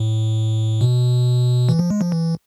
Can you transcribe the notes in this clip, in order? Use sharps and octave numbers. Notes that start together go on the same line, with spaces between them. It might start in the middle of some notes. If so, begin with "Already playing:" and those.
Already playing: A2
B2
E3
F3
G#3
F3
E3